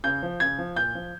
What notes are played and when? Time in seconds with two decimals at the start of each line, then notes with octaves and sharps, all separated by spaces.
0.04 C#3 G6
0.23 F3
0.40 C#3 G#6
0.58 F3
0.76 A#2 G6
0.95 F3